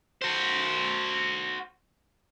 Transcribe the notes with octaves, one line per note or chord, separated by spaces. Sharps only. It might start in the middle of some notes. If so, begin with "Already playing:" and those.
F#4 C5